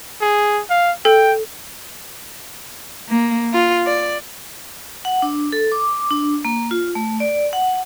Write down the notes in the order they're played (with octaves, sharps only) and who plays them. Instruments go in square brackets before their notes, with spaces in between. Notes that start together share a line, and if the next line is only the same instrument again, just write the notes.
[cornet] G#4
F5
[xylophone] A4 [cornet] G5
[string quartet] A#3
F4
D5
[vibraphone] F#5
D4
A4
D6
D4
A#3
F4
A3
D5
F#5